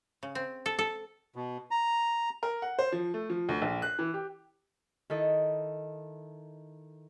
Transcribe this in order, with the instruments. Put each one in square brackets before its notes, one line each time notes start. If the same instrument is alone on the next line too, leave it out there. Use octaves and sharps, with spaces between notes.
[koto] C#3
C4
A4
A4
[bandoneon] B2
A#5
[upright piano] A#4
F#5
C5
F3
A3
F3
D2
A#1
F#6
E3
G4
[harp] D#3 E4 A4 D#5